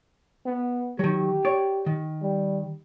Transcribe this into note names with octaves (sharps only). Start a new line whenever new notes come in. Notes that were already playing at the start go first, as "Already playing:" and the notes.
B3
D#3 F#3 G4
C#5 D5
D#3
G3